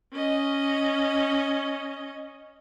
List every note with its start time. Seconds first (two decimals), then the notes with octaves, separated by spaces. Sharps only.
0.13 C#4 D#5